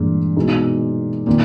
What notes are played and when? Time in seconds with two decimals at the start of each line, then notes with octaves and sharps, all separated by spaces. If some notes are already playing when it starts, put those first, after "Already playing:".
Already playing: G2 A#2 E3 G#3
0.37 B2 G#3 D#4 G#4
1.27 A#2 D#3